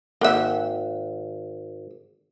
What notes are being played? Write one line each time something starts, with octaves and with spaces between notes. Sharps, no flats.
G#1 A#3 E5 F#5